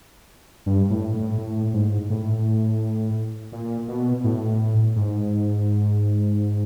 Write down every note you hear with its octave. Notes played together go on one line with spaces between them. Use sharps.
G2
A2
A2
A2
G#2
A2
A#2
B2
A2
G#2